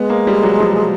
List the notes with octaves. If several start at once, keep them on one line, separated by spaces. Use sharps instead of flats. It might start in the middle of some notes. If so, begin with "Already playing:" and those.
Already playing: G#3 B3
A#3
G3
F#3
F3